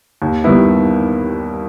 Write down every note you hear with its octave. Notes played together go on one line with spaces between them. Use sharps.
D#2
D#3 G3 B3 E4